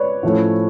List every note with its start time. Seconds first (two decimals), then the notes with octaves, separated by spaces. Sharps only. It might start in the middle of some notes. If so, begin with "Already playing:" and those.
Already playing: B4 C#5 D5
0.23 A2 F3 A3 C#4